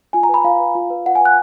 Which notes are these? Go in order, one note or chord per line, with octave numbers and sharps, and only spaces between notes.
F4 G#5
A#5
B4 B5
F4 F5
B4
F4
B4
F4 F#5
G#5
B4 F#6